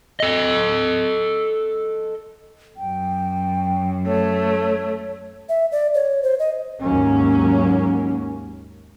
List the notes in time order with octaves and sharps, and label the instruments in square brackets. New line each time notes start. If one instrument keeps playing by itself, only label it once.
[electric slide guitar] A4 D#5
[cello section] F#2 [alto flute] G5
[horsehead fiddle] A3 [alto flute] C#5
[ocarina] E5
D5
C#5
C5
D#5
[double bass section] D#2 G#2 F#3 A#3 C#4